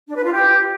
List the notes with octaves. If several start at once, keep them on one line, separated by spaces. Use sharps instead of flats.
D4
B4
F4
G4